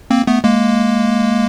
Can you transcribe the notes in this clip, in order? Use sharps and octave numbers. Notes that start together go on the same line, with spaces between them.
A#3 C4
A3 B3
G#3 A#3